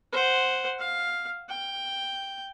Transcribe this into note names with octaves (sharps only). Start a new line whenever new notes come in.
C5 F#5
F5
G5